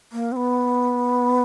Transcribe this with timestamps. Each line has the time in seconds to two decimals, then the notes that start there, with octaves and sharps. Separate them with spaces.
0.12 A#3
0.32 C4
0.36 B3